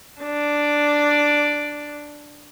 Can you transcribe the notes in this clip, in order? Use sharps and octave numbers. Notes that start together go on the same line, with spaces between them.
D4 D5